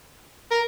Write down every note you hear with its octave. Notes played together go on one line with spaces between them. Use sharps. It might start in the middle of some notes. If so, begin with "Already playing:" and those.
A#4